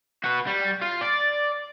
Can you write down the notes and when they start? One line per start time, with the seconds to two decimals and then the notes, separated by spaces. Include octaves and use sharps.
0.24 F#4 B4
0.47 G3
0.81 F4
1.01 D5